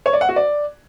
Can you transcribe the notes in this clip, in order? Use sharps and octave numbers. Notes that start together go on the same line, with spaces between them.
C#5
D5
F#5
F#4
D5